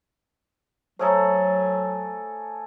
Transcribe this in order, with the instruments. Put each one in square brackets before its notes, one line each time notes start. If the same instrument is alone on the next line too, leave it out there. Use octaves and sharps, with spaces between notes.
[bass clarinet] F#3 [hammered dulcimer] A3 G#4 A4 [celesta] C5 C#5 A#5